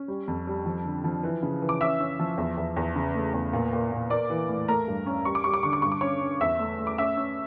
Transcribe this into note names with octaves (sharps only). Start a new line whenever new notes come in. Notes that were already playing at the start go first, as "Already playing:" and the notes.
Already playing: C#4
G3
F2
G3
F3
D3
F3
E3
C#3
E3
D6
C#4 E5 E6
C#4
F3
E2
E2
E2
C#3
A3
E2
A#2
A#2
A#2
A#3 D5 D6
E3
A2
A3 A#4 A#5
G2
C#4
G3 C#6
D6
G3 C#6
D6
D3 C#6
D6
G2 C#6
D6
C#4 C#5 C#6
C#4
E2 E5 E6
A3
A3
D6
C#4 E5 E6
C#4